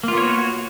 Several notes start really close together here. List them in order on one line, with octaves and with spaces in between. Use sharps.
A#3 F4 B3 C#5 F#4